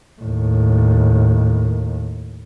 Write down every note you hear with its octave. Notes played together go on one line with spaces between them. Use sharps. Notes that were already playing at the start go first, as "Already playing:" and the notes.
D#2 A2